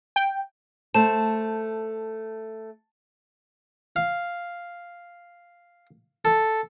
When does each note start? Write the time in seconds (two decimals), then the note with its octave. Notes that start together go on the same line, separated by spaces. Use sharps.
0.16 G5
0.95 A3 C5 A5
3.96 F5
6.25 A4